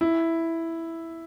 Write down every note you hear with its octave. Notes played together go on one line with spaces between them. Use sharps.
E4